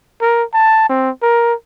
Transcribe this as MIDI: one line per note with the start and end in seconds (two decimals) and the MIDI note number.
0.21 0.43 70
0.53 0.87 81
0.89 1.10 60
1.22 1.54 70